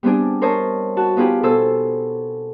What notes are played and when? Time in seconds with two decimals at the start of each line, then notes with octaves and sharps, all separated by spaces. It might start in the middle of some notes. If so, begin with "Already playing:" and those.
0.03 G3 B3 C4 D4 G#4
0.42 A#4 C5 C#5 D#5 A5
0.97 F#4 A5
1.16 B3 D#4 F4 G4 G#4 B4
1.43 B2 G#4 A4 C5 E6